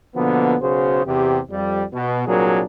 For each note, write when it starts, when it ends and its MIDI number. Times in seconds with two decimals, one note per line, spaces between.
0.15 0.55 47
0.15 0.55 50
0.15 0.55 53
0.15 0.55 58
0.15 0.55 59
0.61 1.05 35
0.61 1.05 49
0.61 1.05 66
0.61 1.05 68
0.61 1.05 72
1.06 1.40 40
1.06 1.40 48
1.06 1.40 67
1.51 1.84 41
1.51 1.84 55
1.93 2.25 47
2.27 2.63 36
2.27 2.63 46
2.27 2.63 54
2.27 2.63 62
2.27 2.63 68
2.27 2.63 70